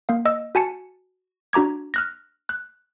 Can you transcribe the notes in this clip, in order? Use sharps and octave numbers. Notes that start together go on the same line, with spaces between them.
A#3 F5
D#5 E6
F#4 G#5 A5 C#7
D4 F#4 A#5 D6 G#6
F6 F#6 A#6
F#6